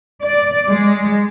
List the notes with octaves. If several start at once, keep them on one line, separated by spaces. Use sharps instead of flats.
D5
G#3